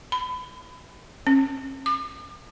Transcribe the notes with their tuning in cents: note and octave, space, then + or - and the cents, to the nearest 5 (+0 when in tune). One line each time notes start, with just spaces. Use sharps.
B5 +25
C#4 -45
D6 +45